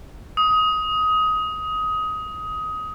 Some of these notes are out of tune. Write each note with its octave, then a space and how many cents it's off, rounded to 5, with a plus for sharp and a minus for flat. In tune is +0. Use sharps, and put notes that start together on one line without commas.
D#6 +20